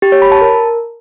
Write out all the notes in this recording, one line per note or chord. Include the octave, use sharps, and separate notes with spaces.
G4
C#5
B5
A5
A#4